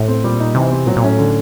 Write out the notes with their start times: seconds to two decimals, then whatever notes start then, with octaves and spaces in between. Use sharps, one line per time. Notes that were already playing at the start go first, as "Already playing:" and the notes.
Already playing: A2
0.08 C4
0.24 A#2 G3
0.40 D#4
0.55 C3 E3
0.71 C4
0.86 A#2 F#3
0.97 A#2
1.02 A2 C#4
1.19 D3